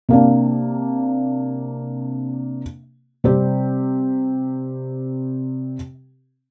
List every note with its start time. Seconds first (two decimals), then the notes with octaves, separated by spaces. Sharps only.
0.09 C3 A#3 D4
3.24 C3 G3 C4 G4